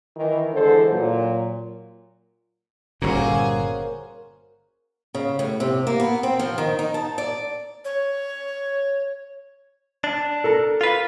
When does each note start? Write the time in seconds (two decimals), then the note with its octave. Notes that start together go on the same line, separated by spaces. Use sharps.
0.17 D#3 E3
0.52 D3 E3 G#3 A4 C5
0.90 A#2 F#3
3.02 G1 A#2 A#3 C#4 F#4 G#4 C5
5.15 C#3
5.39 A2
5.60 C3
5.87 A#3
6.00 B3
6.23 C4
6.39 F3
6.58 D#3
6.79 D#4
6.94 A5
7.18 D5
7.85 C#5
10.04 D4
10.44 A4 A#4 A#5
10.81 F4 B4